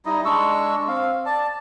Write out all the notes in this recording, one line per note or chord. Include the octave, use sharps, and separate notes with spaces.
G3 D#4 E4 D#5
G#3 D4 C#6 E6
C4 F5
D5 A5